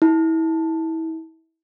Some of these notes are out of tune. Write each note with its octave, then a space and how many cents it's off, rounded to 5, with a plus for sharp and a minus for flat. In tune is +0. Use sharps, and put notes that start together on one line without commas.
E4 -30